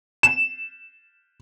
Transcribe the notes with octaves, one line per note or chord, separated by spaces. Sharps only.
E7